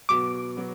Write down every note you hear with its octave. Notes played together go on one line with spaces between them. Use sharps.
B2 F#3 B3 F#4 D6
B2 F#3 B3 F#4